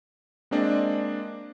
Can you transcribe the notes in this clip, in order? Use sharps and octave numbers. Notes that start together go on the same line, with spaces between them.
G#3 A#3 C4 D4 D5 D#5